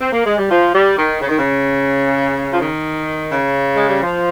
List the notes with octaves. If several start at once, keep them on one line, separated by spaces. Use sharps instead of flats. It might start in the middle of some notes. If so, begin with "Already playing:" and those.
C4
A#3
G#3
G3
F3
G3
D#3
C#3
D#3
C#3
F3
D#3
C#3
G#3
G3
F3